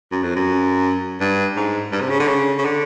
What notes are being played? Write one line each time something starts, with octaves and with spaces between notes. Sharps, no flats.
F#2
F2
F#2
G2
G#2
G2
C3
C#3
D3
C#3
C#3
D3